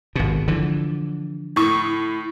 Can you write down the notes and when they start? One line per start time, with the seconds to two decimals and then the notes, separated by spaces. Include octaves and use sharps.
0.15 G#1 B2
0.48 D3 E3 F3
1.56 A2 C#6